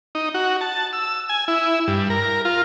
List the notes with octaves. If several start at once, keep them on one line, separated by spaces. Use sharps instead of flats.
D#4
F#4
A5
E6
G#5
E4
G2
A#4
F4